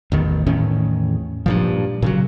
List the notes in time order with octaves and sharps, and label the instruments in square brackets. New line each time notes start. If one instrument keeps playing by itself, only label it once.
[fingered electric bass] A1 E2 D#3
E2 A2 D#3 C#4
G2 A#2 F3
A#2 C#3 F#3